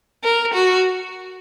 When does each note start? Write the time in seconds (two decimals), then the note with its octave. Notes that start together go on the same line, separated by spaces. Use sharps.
0.24 A#4
0.54 F#4